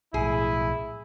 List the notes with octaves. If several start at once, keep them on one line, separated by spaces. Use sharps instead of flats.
B1 A2 E4 G#4